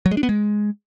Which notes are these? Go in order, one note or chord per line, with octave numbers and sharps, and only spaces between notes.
F#3
G#3
D4
B3
G#3